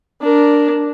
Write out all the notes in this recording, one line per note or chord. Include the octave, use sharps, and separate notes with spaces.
D4 A#4